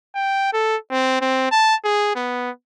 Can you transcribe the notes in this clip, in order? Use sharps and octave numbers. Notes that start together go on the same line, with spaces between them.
G5
A4
C4
C4
A5
G#4
B3